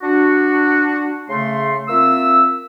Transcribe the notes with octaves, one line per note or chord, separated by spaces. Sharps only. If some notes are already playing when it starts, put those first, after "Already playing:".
D4 F#4
C#3 A3 C6
A#3 C4 F4 E5 E6